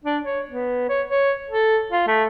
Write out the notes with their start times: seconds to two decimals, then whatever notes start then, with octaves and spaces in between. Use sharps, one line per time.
0.04 D4
0.24 C#5
0.51 B3
0.89 C#5
1.09 C#5
1.50 A4
1.92 F4
2.07 A3